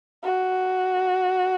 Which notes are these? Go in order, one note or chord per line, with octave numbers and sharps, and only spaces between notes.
F#4